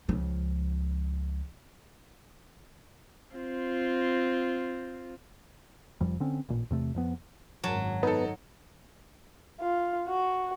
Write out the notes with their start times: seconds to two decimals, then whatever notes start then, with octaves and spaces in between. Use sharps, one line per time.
0.09 C#2 F3
3.34 C4 F4
6.01 F1 F2 F3 G3
6.20 D3 C4 C#4
6.49 A1 A#2
6.70 E2 C3 A3
6.94 F2 F3 B3
7.64 G#1 F#2 F#3 A5
8.03 B3 D#4 A4
9.61 F4
10.08 F#4